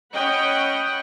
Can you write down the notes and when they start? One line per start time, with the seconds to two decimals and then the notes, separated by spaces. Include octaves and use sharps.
0.13 C#4 C#5 D#5 F#5 G5 B5